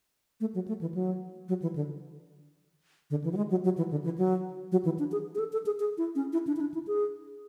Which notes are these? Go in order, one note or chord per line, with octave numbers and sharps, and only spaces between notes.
A3
F#3
A3
E3
F#3
F#3
E3
D3
D3
E3
F#3
G#3
F#3
F#3
E3
D3
E3
F#3
F#3
E3
D4
G#4
G#4
A4
A4
G#4
G#4
E4
C#4
E4
D4
E4
D4
E4
G#4